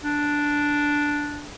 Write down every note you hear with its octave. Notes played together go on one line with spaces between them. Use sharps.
D4